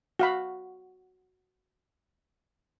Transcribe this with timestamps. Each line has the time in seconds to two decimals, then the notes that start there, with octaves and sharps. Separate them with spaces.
0.19 F#4 F5 B5